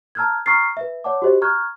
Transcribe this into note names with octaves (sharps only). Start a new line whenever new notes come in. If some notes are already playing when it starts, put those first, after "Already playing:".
A5 A#5 E6 F6 G6 G#6
A#5 C#6 D#6 F6 A6 C7
B4 E5
C#5 D5 F#5 A5 D6
F#4 G4 C5 D#5
A#5 C#6 F6 F#6 G#6